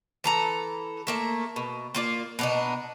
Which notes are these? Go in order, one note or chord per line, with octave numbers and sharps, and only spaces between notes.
E3 A4 A#5
A3 A#3 E5
B2
A#3 F4 D5
B2 D4 D#4